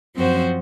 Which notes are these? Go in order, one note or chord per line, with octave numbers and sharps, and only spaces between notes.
F#2 F3 C4 F#4 C5